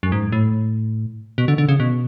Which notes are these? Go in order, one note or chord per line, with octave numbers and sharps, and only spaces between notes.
F#2
G#2
A2
B2
D3
D3
C#3
B2